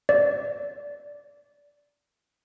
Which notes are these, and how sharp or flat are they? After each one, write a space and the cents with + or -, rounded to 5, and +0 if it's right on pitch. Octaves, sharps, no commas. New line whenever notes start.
D5 -15